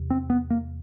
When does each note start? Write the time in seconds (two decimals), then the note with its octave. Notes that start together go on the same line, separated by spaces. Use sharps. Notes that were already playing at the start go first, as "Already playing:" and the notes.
Already playing: E2 C3
0.10 C4
0.30 B3
0.50 A#3